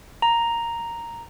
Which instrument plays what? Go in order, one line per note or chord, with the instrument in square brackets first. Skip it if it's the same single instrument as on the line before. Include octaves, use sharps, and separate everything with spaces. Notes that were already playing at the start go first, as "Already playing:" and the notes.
[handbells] A#5